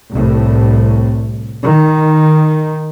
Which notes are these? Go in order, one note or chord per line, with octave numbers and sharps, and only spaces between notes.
C2 A2
D#3